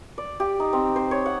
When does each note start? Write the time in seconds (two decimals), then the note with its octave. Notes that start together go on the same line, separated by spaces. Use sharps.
0.18 D5
0.40 G4
0.60 D#4
0.73 C4
0.96 C5
1.11 C#5
1.26 F#5